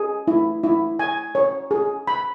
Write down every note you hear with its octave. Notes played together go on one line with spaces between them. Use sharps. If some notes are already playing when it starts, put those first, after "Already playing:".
Already playing: G#4
E4
E4
G#5
C#5
G#4
B5